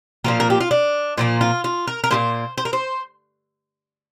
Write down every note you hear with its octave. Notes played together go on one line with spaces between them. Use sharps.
A#2 F3 A#3 F4
A#4
G4
F4
D4
A#2 F3 A#3 F4
F4
F4
A#4
A#4
A#2 F3 A#3 C5
C5
A#4
C5